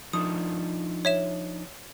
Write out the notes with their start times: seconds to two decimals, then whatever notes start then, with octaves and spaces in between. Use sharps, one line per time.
0.13 F3 D4 D#4 D#6
1.05 C#5 E5 E7